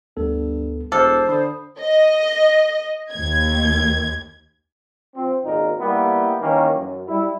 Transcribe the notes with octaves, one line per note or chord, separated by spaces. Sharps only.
D2 G2 B3 A4
E1 A4 C5 D6 F6 F#6
D3 B5 D#6
D#5
D#2 G#6
F3 C4
G#1 C#2 A#2 D#4 A#4
G3 A#3 B3 E4 G4
D#3 E3 A#3 C#4
F#2
G3 E4